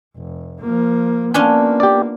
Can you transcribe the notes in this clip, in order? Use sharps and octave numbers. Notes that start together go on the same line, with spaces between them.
F1
F3 A#3
A#3 B3 C#4 D4 F4 G#5
G4 D5